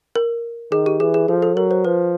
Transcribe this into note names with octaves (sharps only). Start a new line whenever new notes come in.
A#4
D#3 G#4
G4
E3 G#4
G#4
F3 A4
A4
F#3 A#4
C5
F3 B4